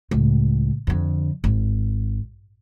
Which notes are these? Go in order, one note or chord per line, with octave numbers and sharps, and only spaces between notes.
C#2 A2
F2 D3
G#1